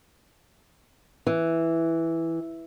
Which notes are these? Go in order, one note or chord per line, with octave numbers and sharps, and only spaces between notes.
E3